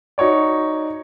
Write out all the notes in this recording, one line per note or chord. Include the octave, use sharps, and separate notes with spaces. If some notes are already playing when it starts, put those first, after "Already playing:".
D#4 F#4 C#5 D5